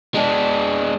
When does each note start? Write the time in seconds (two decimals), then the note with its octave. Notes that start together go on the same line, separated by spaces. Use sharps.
0.15 G#3 D4